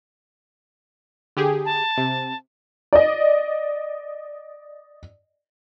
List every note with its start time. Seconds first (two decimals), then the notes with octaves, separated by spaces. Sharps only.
1.37 D3 G4 G#4
1.65 A5
1.98 C3
2.93 D5 D#5